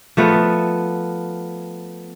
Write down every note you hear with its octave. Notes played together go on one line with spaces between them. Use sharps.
F3 A3 B3